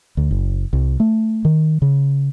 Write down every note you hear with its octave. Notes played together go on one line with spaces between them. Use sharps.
D2
F#1
C2
A3
D#3
C#3